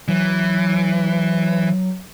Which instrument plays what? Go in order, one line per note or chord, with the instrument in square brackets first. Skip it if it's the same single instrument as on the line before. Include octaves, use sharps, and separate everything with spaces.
[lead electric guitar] E3 [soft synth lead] F#3